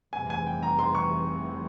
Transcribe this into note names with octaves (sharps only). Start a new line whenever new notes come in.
F1 F2 C3 E3 G3 G#5
G#5
G5
A#5
C6
C#6